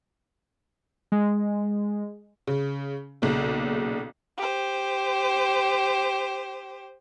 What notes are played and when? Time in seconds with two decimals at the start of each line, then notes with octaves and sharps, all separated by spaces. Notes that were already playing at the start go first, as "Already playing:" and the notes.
1.12 G#3
2.47 C#3
3.22 B1 A#2 C#3
4.38 G4 C5